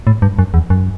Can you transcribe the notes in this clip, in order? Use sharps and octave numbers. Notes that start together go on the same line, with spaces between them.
A2
G2
F#2
E2
F#2